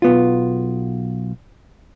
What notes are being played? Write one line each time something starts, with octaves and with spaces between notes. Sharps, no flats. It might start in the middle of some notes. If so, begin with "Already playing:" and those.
B1 B3 F4